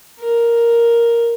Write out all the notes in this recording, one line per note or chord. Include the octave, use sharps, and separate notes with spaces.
A#4